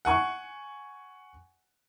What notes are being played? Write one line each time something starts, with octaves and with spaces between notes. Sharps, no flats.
F#5 G#5 C#6